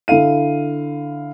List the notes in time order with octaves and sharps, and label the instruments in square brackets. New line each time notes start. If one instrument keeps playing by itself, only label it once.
[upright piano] D3 E4 A4 F5 D#7